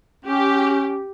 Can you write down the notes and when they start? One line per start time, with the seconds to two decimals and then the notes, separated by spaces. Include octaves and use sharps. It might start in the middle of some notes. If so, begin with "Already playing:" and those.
0.25 C#4 G4